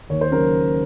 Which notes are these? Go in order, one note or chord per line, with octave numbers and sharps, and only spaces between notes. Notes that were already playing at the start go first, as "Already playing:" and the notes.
D#2 C#5
C5
C#3 F#3 A#4